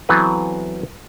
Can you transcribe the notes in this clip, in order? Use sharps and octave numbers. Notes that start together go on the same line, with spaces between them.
E3 F#3 B3 C4 A4 B4